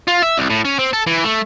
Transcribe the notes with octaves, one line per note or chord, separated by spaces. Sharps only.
F4
E5
C2
A2
C#4
C4
A4
E3
A3